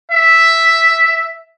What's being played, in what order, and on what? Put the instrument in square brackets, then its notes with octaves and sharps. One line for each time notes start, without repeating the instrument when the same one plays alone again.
[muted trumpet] E5